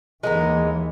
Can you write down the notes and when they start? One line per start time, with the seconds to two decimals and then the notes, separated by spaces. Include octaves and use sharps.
0.23 D#2 E3 G#3 B3 A#4